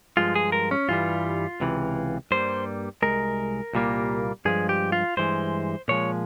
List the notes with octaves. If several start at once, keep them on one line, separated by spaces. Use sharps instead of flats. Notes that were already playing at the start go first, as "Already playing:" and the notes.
G2 F3 G#3 F4
G#4
A#4
C#4
G2 E3 G3 F4
C#2 C3 E3
G2 G3 A#3 C5
C2 A#2 G#3 A#4
C2 A#2 G3 A#3
G2 F3 G#3 G#4
G4
F4
G2 E3 G#3 C5
A#2 F3 G#3 C#5